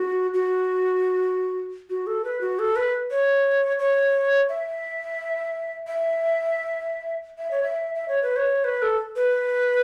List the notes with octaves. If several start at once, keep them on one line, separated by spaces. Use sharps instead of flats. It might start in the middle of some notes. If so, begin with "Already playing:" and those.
Already playing: F#4
F#4
F#4
A4
B4
F#4
A4
B4
C#5
C#5
E5
E5
E5
C#5
E5
E5
C#5
B4
C#5
B4
A4
B4